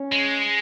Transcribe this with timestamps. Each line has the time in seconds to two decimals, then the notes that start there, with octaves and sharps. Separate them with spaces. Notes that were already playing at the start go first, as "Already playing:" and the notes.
Already playing: C#4
0.12 G#3